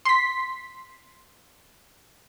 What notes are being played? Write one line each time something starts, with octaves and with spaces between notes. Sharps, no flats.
C6 B6